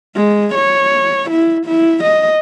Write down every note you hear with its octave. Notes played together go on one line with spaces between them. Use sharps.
G#3
C#5
E4
E4
D#5